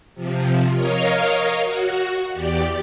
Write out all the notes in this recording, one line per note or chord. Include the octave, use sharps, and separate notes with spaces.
C3 F3
A#4 C#5 D#5 F5
F#4
E2 G4 D5